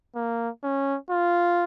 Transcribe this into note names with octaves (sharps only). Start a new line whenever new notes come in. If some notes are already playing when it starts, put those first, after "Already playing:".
A#3
C#4
F4